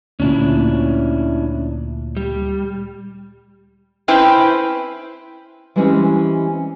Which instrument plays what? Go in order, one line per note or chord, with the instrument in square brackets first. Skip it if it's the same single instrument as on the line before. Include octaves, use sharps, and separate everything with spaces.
[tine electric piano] D2 A#2 [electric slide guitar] C#4 D4 E4
[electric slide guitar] G3
[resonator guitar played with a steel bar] C4 C#4 E4 B4 C5 G5
[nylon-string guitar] E3 G3 G#3 C4 C#4 E4